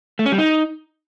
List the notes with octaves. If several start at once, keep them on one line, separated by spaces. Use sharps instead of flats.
A3
C#4
G3
D#4